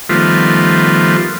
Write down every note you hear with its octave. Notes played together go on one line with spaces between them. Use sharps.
D#3 F3 G3 A3 B3 F4